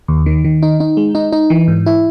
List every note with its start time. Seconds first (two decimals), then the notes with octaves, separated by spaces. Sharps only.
0.08 D#2
0.26 D#3
0.44 D#3
0.62 D#4
0.80 D#4
0.97 G#3
1.15 D#4
1.32 D#4
1.50 E3
1.68 G#2
1.86 E4